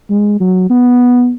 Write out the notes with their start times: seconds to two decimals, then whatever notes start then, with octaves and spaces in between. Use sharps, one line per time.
0.10 G#3
0.40 F#3
0.70 B3